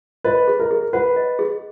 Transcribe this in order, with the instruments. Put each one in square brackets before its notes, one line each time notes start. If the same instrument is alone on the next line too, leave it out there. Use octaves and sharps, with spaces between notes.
[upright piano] B4 [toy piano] D#5
[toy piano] G#4
[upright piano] A#4
[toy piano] G#4
[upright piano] B4 [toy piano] F#5
[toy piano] D#5
G#4